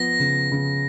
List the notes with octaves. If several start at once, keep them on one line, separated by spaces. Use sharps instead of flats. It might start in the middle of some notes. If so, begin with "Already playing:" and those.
Already playing: F3 B3 A#6
C#3
C#3